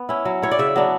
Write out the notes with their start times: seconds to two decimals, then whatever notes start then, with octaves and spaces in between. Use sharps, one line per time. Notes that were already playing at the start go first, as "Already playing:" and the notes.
Already playing: B3
0.09 C#4 E4
0.25 F#3
0.42 C#4 E4 C#5
0.51 D5
0.59 C#3 E5
0.76 F#3 B3 D4